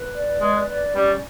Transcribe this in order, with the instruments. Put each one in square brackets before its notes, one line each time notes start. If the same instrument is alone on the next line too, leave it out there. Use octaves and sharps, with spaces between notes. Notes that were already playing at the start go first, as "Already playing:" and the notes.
Already playing: [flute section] B4
D5
[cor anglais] G#3 [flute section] B4
[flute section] D5
[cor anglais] G3 [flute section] C#4